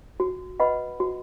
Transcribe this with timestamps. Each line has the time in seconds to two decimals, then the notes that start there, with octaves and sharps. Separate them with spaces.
0.20 F#4
0.60 B4 D#5 F#5 B5
1.00 F#4